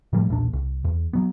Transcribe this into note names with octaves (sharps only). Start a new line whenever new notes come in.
A2 F3 G3 A3
B1 E2 A#2 D4
C2
E2
F#3 B3